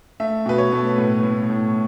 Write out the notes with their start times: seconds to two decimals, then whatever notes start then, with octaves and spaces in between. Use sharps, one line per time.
0.20 A3 E5
0.46 B2 B4
0.58 C#5
0.72 A3
0.98 A2
1.23 A2
1.50 A2